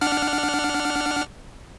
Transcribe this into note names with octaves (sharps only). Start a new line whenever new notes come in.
D4 F#5 F6